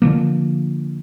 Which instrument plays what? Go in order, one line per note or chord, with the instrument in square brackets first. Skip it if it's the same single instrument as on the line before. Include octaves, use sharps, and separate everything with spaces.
[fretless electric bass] D3 D#3 F3 A#3